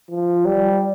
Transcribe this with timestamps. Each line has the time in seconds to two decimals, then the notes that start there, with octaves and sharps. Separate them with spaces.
0.10 F3
0.46 G3